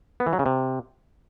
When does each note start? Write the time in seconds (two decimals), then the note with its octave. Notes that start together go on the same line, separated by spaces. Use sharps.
0.20 B3
0.26 E3
0.33 F#3
0.39 C#3
0.46 C3